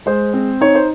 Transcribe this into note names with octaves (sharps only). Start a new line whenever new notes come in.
G#3 C5
C4
D#4 C#5
C5